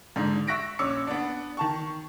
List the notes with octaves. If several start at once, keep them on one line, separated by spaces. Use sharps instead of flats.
G#2 D3 D#4
E5 C#6 F#6 A#6 B6 D7
A#1 C#4 D6 E6 C#7
B3 D4
D#3 A5 C#6